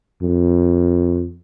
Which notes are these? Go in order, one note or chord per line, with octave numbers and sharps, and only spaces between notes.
F2